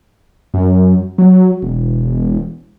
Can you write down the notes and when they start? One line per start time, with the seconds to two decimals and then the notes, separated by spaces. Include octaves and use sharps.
0.54 F#2
1.18 F#3
1.63 E1